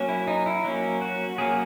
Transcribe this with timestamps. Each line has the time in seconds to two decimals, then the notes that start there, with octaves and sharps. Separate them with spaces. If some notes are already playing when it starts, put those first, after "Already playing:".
Already playing: F#3 A#3 C#4
0.09 E4
0.27 D#4
0.46 E4
0.65 F#3 A#3 C#4
1.02 F#4
1.38 F#3 A#3 C#4 G#4